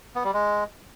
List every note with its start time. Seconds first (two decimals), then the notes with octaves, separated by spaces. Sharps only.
0.15 B3
0.24 G3
0.33 G#3